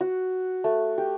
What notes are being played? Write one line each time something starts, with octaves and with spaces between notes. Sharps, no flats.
F#4
A3
G4